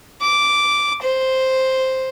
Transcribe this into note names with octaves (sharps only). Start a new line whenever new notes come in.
D6
C5